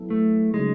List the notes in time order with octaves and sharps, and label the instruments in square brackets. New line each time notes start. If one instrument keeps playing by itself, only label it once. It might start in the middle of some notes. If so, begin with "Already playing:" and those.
Already playing: [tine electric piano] F#3 B3 E4 A4
[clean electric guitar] A3
[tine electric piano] C#3 F#3 A3 D#4 [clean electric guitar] G#3